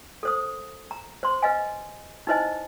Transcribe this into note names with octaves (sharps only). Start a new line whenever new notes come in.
A4 C5 D#6
A#5
C5 C6
B4 D#5 F5 G#5
D#4 E4 B4 C5 D#5 G#5